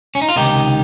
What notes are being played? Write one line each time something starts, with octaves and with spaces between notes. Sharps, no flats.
C#4
D#4
F4
C#2 C3 D#3 D#4 G4